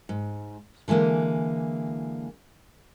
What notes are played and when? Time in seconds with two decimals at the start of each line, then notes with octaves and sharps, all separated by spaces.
0.09 G#2
0.88 D3 E3 G#3 A#3